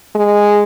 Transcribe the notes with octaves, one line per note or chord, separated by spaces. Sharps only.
G#3